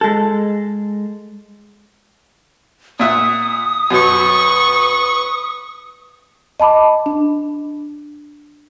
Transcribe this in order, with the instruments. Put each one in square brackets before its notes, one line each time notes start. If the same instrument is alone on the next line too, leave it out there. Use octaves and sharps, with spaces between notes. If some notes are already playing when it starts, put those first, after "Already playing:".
[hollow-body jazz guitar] G#3 A4
[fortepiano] A#2 E5 F#5 [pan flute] D#6
[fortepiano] F#2 B2 [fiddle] B4 C#6
[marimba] D#5 A5 B5 D6
D4